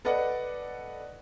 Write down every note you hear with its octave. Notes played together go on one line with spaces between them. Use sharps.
A4 B4 D5 D#5 F#5